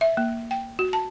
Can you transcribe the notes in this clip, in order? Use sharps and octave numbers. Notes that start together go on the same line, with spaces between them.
E5
A#3
G5
F#4
A5